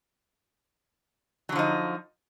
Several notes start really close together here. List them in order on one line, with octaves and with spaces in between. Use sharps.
F#3 D3 F3 D#4